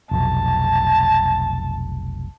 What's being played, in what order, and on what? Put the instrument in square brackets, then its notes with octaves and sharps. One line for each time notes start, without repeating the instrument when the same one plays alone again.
[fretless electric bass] F1 B1 [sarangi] A5